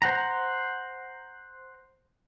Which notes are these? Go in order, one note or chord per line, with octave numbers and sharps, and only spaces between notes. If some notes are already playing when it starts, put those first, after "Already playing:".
C5 F#5 A#5